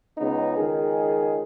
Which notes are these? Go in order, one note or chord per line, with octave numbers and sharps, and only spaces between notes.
C#2 C#3 B3 D#4
C#2 D#3 G#4